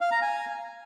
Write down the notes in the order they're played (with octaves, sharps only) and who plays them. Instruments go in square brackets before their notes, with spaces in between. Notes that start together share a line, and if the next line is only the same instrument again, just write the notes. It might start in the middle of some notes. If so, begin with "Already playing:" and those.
[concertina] F5
A#5
G#5